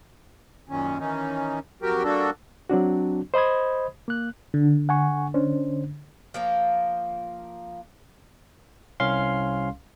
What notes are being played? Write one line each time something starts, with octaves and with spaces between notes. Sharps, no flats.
F#2 A#2 D#3 C#4
D#3 E3 C#4 D#4
F2 F#3 F#4 G4 A#4 G5
G3 A#3 D4 F#4 A4
F#3 C4 D4 F#4
C5 D#5 B5 D#6 G#6
A#3 F#6
D3
F#5 G#5 C#6
C#4 D4 C5
F3 A#3 F4
C2 C#4 F5 C6